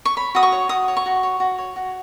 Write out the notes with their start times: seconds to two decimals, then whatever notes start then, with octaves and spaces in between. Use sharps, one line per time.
0.05 C#6
0.17 C#5 B5
0.35 F#4 D#6
0.43 C#6
0.52 C#5
0.69 F#4 D#6
0.88 C#5
0.97 C#6
1.06 F#4
1.23 C#5
1.40 F#4
1.58 C#5
1.76 F#4